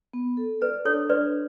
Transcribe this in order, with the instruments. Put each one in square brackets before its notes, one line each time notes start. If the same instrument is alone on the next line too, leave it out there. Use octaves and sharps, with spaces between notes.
[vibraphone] B3
A4
[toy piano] B4 [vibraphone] D5
[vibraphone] D4 [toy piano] A4 C#5
[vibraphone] D4 [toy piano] B4 D5